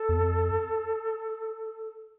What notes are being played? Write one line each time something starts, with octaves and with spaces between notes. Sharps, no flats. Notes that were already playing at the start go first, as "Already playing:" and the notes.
Already playing: A4
E2
F2